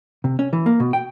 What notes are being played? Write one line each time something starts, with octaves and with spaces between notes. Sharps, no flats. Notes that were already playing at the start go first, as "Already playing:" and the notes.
C3
C#4
E3
A#3
B2
G5